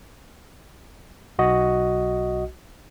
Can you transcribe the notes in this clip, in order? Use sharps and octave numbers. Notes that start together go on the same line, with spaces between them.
B1 F#4 D#5